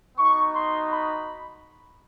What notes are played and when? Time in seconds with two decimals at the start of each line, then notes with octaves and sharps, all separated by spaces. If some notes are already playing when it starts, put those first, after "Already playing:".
0.17 B3 D#4 F#4 C#6
0.54 C6
0.90 B5